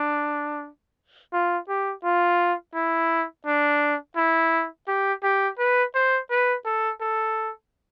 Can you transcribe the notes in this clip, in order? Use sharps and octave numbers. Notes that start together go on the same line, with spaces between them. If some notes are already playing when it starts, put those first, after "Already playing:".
Already playing: D4
F4
G4
F4
E4
D4
E4
G4
G4
B4
C5
B4
A4
A4